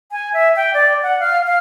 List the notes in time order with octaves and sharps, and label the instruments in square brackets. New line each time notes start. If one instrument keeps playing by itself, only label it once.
[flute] G#5
E5
G5
D5
F#5
F5
F5